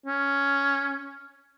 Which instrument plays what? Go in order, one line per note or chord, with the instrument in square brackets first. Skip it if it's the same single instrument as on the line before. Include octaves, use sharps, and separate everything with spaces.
[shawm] C#4